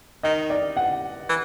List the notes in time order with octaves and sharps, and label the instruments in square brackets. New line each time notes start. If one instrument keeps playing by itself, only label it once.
[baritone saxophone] D#3 [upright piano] D#5
[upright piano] D5
F#5
[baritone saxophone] E3